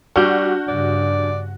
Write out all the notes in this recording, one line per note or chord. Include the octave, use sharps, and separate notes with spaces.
G3 D4 F#4 F6 G6
G2 C#3 D5